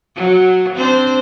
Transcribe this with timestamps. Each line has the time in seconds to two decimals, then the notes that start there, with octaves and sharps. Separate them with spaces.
0.16 F#3
0.75 C4 D4 C5